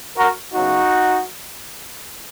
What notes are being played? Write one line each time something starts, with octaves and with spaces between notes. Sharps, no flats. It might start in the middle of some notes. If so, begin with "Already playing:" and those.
F#4 A#4
C#3 F#3 B3 D#4 F#4